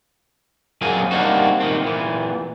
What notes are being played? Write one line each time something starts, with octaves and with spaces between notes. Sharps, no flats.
F#2 A#2 F#3 A#3 C4 G#4
G3 A#3 C4 D4 D#4 F#4
A#2 D#3 C4
A#2 E3